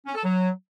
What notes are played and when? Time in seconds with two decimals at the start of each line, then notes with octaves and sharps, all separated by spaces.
0.06 C#4
0.15 A4
0.24 F#3